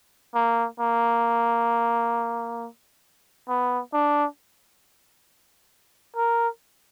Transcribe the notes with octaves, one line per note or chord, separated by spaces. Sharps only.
A#3
A#3
B3
D4
A#4